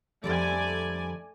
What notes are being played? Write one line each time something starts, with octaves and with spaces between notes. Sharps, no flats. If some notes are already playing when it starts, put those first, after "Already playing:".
F2 D3 G3 A3 D5 G#5